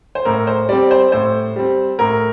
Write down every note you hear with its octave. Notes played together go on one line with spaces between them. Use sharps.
C5
A2 A#4
C5
G3 C4 D5
C5
A2 C5
G3 C4
A2 A#4